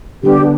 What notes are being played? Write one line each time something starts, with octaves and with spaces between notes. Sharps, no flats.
D3 G3 B3 D4 G4